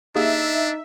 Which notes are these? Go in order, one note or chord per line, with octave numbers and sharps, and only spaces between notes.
A#3 D4 D#4 G4 G#4 E5